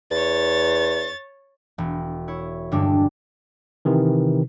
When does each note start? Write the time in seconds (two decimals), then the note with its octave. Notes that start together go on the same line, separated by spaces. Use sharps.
0.11 E2 C#5 A6
1.78 E1
2.28 E4 C#5
2.71 G2 D3 G3 G#3 D4
3.85 C3 D#3 E3